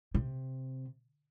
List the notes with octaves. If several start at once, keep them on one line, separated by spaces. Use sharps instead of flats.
C3